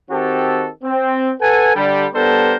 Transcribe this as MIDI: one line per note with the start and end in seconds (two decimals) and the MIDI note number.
0.10 0.69 51
0.10 0.69 60
0.10 0.69 66
0.10 0.69 67
0.10 0.69 69
0.84 1.32 60
1.41 1.73 69
1.41 1.73 71
1.41 1.73 78
1.41 1.73 80
1.75 2.06 50
1.75 2.06 55
2.14 2.57 55
2.14 2.57 59
2.14 2.57 62
2.14 2.57 69
2.14 2.57 70
2.14 2.57 72